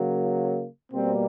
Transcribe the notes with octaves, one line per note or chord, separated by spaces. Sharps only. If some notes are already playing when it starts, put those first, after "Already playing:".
Already playing: C#3 F#3 A#3
B2 G3 A#3 C4